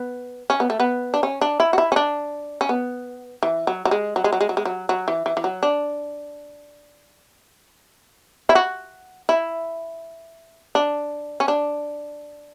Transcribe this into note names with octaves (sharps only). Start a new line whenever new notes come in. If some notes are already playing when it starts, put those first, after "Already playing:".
Already playing: B3
C#4
B3
A3
B3
D4
C#4
D4
E4
F#4
E4
C#4
D4
C#4
B3
E3
F#3
F#3
G#3
F#3
G#3
F#3
G#3
F#3
G#3
F#3
F#3
E3
E3
E3
F#3
D4
E4
F#4
E4
D4
C#4
D4